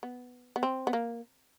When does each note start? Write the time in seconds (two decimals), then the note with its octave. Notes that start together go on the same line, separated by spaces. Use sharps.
0.03 B3
0.56 B3
0.63 C4
0.87 B3
0.93 A#3